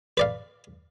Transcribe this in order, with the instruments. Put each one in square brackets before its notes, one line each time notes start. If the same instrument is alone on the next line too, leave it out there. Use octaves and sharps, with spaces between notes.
[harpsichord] B4 D5 F5